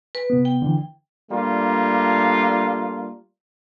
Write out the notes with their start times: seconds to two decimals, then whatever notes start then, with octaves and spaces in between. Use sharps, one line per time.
0.15 B4
0.30 C3 B3
0.45 G5
0.62 D3 E3
1.31 G3 A3 A#3 D4 F4